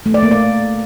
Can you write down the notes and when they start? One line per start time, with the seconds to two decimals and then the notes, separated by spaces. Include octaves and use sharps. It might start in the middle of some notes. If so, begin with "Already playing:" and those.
0.06 A3
0.14 D5
0.23 A#3
0.31 D5